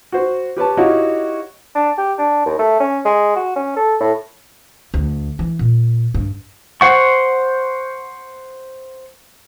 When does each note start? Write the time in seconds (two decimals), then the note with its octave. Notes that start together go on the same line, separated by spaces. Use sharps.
0.12 F#4 C5
0.57 G4 B4 C#5 A5
0.77 D#4 E4 F#4 G4 C#5 F5
1.75 D4
1.98 G4
2.18 D4
2.46 D#2
2.59 A3
2.80 C#4
3.05 G#3
3.36 F#4
3.56 C#4
3.76 A4
4.00 A2
4.94 D2
5.39 E3
5.59 A#2
6.14 G2
6.81 C5 F#5 C#6